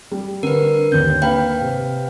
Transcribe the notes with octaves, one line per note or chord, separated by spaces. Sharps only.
G3
D3 A#4 B4
D#2 D3 G6
A#3 B4 F5 G5 B5
C3